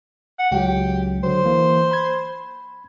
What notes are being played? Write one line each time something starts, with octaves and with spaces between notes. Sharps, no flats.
F#5
C#2 F#3 G4
D3 F#3 C5
E3 A#3
B5 G#6